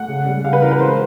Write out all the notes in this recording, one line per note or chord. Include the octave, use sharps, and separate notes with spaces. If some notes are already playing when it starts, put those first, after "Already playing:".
Already playing: A3 F#5
C#3
G3
C#3 F5
B4
E3 A#4
B4
G#3 C5